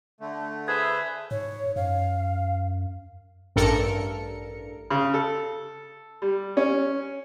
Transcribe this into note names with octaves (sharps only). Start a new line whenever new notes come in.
D3 A3
G#4 B4 C5 E5 G#6
G#2 C#5
F#2 F5
A1 G2 A4 A#4 C#7
C#3
A4
G3
C#4